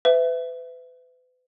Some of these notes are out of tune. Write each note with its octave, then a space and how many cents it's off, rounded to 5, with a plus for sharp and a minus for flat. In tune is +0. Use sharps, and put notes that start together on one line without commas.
B4 +35 E5 +5